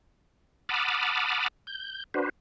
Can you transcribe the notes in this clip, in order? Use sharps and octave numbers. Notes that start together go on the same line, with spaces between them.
F#5 A5 B5 D6 D#6 F6
G6
D4 F#4 B4 C5